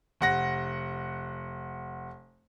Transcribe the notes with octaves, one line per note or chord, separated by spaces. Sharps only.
F1 F#5 A#6